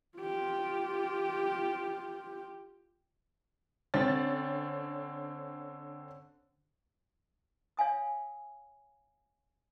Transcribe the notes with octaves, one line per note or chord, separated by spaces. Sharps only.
F4 G4
D3 C4 C#4 A6
C#5 F5 G#5 D#6